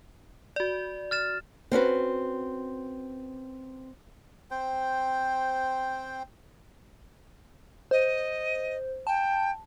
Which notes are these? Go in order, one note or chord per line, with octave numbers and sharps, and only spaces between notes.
F#4 D5
F6 A6 E7
C4 C#4 F#4 B4
C4 C5 G5
C5 D#5
G5 A5